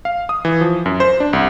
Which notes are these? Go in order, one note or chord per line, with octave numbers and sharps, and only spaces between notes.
F5
D#6
E3
F3
F#2
C5
D4
C2